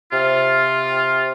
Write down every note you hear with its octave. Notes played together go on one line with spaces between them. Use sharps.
C3 F4